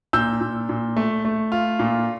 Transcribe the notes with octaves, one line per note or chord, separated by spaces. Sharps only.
A#2 E6 G6
A#2
A#2
A3
A3
F4
A#2